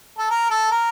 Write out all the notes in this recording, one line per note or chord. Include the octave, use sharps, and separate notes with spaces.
A4
A#4
A4
A#4